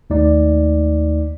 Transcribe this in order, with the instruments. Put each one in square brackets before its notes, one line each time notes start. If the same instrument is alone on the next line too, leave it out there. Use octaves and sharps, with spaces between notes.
[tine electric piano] D#2 A3 D#4 D5